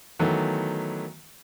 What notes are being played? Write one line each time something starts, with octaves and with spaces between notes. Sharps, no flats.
D#3 E3 F#3 A3 B3